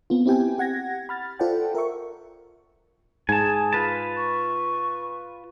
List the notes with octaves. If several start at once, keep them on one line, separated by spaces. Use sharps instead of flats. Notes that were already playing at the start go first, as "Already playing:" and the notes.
B3 C4 F4
C4 E4 G4 G5 G#5
G4 F#5 G#6 A#6
B5 F6 A6
F4 A4 C5 D5 F#5 G5
A#4 E5 C#6
G#2 G#4 G#5 A5
F4 B4 A5
C#6